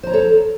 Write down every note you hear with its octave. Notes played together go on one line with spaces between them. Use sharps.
A4 C5 C#5 A#5